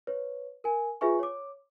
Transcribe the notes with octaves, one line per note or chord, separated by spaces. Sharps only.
B4 C#5
A#4 G#5
F4 G#4 B4 E5 G#5 C#6
C#5 D6